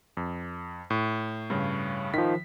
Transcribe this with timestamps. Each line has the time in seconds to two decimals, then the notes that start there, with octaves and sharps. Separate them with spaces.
0.17 F2
0.90 A2
1.50 G2 C#3
2.14 D#3 F3 B6